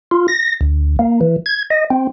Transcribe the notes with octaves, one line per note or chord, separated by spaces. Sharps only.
F4
A#6
D2
A#3
E3
G#6
D#5
C4